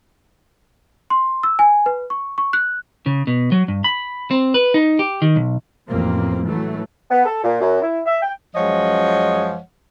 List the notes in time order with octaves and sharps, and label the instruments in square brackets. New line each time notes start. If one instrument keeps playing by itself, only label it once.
[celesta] C6
E6
G#5
B4
C#6
C#6
F#6
[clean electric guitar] C#3
B2
F#3
G2
B5
C4
B4
D#4
G4
D#3
B1
[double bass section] A1 F2 A#3 C4
E3 F#3 A3
[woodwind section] B3
A4
A#2
F#2
E4
E5
G5
[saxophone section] F#2 F3 G#3 C#5 D#5 F#5